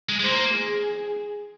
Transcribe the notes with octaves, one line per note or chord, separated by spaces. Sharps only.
G#3
G#3
A#3 C5
G#4